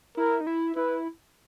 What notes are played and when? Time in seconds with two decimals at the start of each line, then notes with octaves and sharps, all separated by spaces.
0.17 E4 A#4
0.41 D#4
0.47 E4
0.76 E4 B4